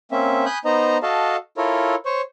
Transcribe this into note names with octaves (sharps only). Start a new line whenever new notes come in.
A#3 C4 C#4 E5
G#5 B5 D#6 F#6 G6
B3 D#4 C5 D#5 A#5
F#4 A4 D#5 F5 A5
E4 F4 A4 A#4 C#5
C5 C#5 C#6